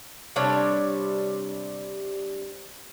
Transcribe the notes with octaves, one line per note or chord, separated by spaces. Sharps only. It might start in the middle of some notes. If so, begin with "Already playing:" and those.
C3 G3 D4 C#5